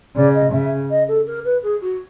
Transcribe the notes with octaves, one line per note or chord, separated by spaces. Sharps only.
C#3 D5
D#5
C#3 E5
D#5
A4
A#4
B4
G#4
F#4